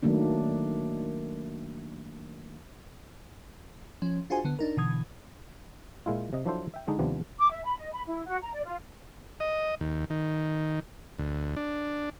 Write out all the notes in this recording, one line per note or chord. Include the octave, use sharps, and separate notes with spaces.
D#3 F#3 A3 A#3 D4
F3 C#4
D4 F4 F#4 G#4 C5 G#5
D3 B3
D4 D#4 A#4
B2 D3 E3 D#6 G#6
A#2 G#3 E4 F4
C3 D#5
F3 F#3 D4 E4 A4 C5
E5 G5
D3 G#3 D4 D#4
D#2 C3 F3 G3 B3 D4
D6
E5
B5
D#5
B5
E4
F#4
A#5
D5
F4
D#5
D#2
D#3
D2
D4